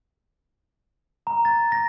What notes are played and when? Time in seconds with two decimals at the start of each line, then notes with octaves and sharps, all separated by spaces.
1.27 A#5
1.45 A6
1.72 A#6